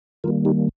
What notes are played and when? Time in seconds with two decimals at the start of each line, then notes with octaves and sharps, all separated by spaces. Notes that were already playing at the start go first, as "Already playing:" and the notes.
0.24 D#3 G3 A#3 F4 A#4
0.45 D#4 G4